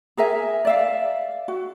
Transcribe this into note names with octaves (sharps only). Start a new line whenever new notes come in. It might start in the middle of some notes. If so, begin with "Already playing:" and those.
G#4 A#4 E5 G#5
D5 E5 F5
F#4